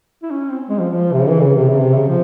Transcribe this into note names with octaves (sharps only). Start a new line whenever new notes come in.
E4
C#4
C4
G#3
F3
F3
C3
C#3
E3
C#3
C3
C#3
C3
C#3
F3